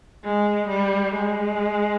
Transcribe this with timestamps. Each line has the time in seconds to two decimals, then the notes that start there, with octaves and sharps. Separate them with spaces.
0.24 G#3
0.69 G3
1.15 G#3